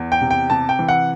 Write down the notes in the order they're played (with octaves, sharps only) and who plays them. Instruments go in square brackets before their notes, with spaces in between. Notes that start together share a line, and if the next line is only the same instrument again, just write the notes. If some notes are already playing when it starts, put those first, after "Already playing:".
Already playing: [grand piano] E2
G5
C3
G5
C3 A5
G5
E3
F#5